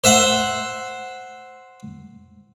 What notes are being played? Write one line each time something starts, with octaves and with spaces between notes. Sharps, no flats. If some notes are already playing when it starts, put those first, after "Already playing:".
C5 E5 F#5